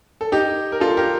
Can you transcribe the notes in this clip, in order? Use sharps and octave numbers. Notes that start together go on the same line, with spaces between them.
A4
D#4 G4
A#4
F4 A4
G4 A#4